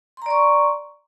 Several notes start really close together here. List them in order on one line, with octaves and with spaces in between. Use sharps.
C6 A#5 D5 C#6